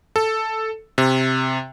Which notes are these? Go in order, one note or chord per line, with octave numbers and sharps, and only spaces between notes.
A4
C3